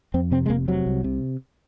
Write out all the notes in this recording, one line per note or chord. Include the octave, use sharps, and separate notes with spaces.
F2 C4
C3 C4
G#3
F1 A#3
C3 F#3
C2
C3